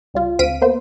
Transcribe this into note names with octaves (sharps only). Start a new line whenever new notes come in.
C#2 G3 F4
D2 C4 F5 B6 D7 D#7
A#3 B3 C5